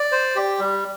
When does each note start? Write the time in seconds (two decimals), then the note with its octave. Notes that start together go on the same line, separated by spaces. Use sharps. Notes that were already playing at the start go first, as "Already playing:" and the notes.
Already playing: D5
0.12 C5
0.35 G4
0.59 G3